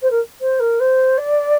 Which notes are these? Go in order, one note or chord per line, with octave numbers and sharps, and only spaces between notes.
C5
A#4
C5
A#4
C5
D5